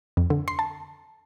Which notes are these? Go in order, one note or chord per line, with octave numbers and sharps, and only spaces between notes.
F2
D3
C6
A5